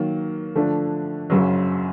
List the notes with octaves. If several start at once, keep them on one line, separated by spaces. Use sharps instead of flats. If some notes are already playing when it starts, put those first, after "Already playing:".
Already playing: D#3 F#3 A#3
D3 F3 A3 D4
F#1 F#2 C#3 F#3